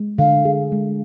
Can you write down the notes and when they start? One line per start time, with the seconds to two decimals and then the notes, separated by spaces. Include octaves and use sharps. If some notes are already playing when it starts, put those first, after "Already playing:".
Already playing: G#3
0.19 D3 F5
0.45 G#4
0.72 G#3